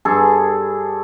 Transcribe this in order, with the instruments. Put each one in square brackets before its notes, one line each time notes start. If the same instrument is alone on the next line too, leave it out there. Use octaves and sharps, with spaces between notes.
[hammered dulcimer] G2 G#4 A4